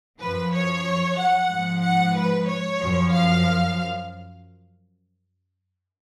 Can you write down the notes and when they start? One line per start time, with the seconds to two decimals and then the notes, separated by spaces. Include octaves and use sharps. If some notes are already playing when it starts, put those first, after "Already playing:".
0.20 F#2 F3 B4
0.53 C#5
1.18 F#5
1.50 G#2 F3
1.82 F#5
2.15 B4
2.47 C#5
2.80 F#2 F3
3.12 F5